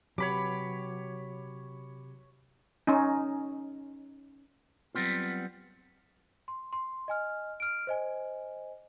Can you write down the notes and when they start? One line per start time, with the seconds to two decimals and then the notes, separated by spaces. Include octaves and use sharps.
0.18 C3 F#3 G4 C#5 B5 D6
2.87 C#4 D#4
4.95 F#3 G3 B3 C4 F4
6.48 C6
6.73 C6
7.08 D#5 G#5 F6
7.60 F6 D7
7.87 C5 D#5 G#5